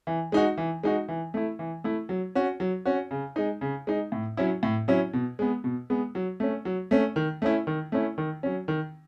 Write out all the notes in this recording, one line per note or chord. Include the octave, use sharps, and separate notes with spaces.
E3
G#3 D#4 F#4
E3
G#3 D#4 F#4
E3
A3 E4
E3
A3 E4
F#3
C#4 F#4
F#3
C#4 F#4
C#3
G#3 D#4
C#3
G#3 D#4
A2
F#3 C#4 E4
A2
F#3 C#4 E4
B2
G#3 B3
B2
G#3 B3
F#3
A3 C#4
F#3
A3 C#4
D#3
A3 C#4 E4
D#3
A3 C#4 E4
D#3
F#3 C#4
D#3